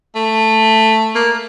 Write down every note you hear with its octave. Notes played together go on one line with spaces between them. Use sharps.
A3
A#3